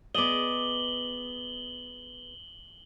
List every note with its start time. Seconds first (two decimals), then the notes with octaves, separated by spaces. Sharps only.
0.15 B3 G#4 D5 D#5 D6 F#7 G7